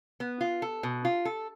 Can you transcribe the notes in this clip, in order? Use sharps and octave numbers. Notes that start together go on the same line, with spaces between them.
B3
F4
A4
B2
F4
A4